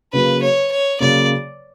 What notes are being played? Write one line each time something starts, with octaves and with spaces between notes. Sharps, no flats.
C#3 F#3 A#3 B4
C#5
C#5
C#3 F#3 A#3 D5